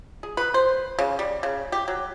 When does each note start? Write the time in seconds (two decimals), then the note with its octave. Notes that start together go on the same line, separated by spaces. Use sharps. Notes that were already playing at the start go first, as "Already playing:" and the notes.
0.23 G#4
0.37 B4
0.54 C5
0.99 C#3
1.19 G3
1.43 C#3
1.72 G4
1.88 F#3